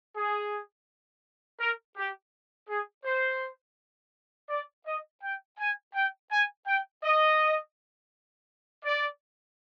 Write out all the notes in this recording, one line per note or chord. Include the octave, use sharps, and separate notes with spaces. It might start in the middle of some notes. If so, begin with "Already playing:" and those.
G#4
A#4
G4
G#4
C5
D5
D#5
G5
G#5
G5
G#5
G5
D#5
D5